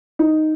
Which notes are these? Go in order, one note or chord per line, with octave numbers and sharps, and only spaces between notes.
D#4